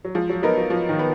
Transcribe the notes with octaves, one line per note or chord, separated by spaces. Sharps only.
F#3
F3 G#3
F#3
F#3 B3 D#4 A#4
F#3
F3 F#3
D#3
B3